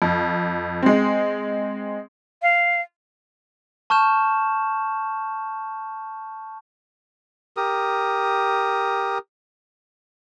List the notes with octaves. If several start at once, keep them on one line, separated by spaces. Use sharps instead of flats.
F2
G#3 C4
F5
A5 C#6 F6 G6 E7
G4 A#4 D#6